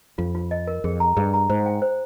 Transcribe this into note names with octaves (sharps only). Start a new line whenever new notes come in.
F2 F4
F4
D#5
A#4
F2 G#4
A#5
G2 G#4
A#5
G#2 C5
G5
C5